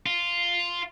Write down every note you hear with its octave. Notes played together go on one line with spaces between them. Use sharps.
F4